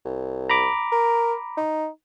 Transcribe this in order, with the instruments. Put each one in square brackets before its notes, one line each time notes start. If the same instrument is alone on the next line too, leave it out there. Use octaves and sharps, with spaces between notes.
[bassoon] C2
[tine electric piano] A#5 B5 D6
[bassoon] A#4
D#4